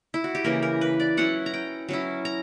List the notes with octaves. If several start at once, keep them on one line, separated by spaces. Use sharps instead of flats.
E4
F#4
G4
C#3 E3 A#3 A#4
A#4
B4
D5
F#3 C#4 E4 F#5
A#5
G5
F#3 C#4 E4
A#5